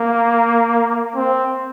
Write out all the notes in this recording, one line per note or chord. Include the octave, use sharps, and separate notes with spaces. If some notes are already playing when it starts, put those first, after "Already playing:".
Already playing: A#3
C4